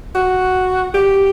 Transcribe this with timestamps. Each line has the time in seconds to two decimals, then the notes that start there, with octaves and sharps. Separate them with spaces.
0.15 F#4
0.95 G4